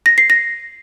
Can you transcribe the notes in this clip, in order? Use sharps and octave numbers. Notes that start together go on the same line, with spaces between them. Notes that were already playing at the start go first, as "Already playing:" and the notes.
A#6
C7
A#6